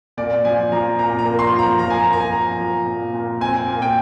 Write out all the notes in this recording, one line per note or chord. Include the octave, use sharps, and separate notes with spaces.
A#2 D5
F3 G#5
F3 A#5
A#2 A#5
A#5
A#3
C6
F3
A#5
F3 A#5
G#5
A#5
A#3
A#5
G#5
F3
F3
A#2
A#2
C4 G#5
A#2
G5